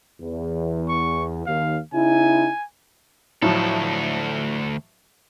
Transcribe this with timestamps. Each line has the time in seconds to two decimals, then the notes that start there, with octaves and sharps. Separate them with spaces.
0.21 E2
0.88 C#6
1.47 D#2 F5
1.93 C#3 D#4 E4 G#5
3.42 D2 A2 F3 F#3 A4